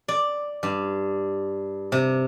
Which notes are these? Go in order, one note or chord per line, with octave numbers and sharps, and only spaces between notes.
D5
G2
C3